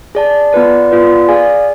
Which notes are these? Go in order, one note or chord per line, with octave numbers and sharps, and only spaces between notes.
G#4 D5 A5
B3 F4 B4 D5
B3 F4 B4 D5
G#4 D5 F5 G#5